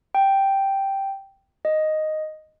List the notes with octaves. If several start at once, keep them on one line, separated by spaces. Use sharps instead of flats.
G5
D#5